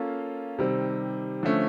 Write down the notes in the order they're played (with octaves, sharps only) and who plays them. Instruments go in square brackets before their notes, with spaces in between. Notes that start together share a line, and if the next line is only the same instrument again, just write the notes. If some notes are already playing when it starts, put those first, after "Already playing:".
Already playing: [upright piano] A#3 C#4 F4 A4
C3 D#3 G3 C4
D3 F3 A3 C#4